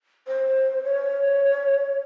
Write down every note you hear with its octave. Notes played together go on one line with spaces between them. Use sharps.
C5
C#5